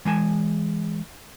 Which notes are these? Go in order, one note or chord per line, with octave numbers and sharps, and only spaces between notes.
E3 G#3 G#5 A5